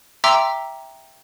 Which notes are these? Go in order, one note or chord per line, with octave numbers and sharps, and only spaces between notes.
E5 G5 A#5 C6 D6 E6